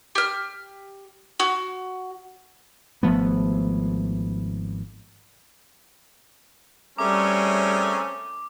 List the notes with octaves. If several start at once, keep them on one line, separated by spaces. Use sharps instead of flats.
G4 F6
F#4
G#1 F3 A3 B3
G3 A3 C4 C#4 G#4 A#4 D6